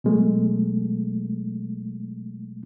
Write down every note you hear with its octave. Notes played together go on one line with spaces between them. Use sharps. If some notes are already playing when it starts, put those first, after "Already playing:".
B2 F#3 G#3 A3